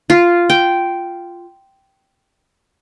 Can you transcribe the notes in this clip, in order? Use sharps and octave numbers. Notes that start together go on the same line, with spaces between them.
F4
G5